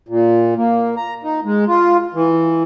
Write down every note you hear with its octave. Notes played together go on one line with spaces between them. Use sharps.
A#2
A#3
A#5
D#4
G#3
F4
E3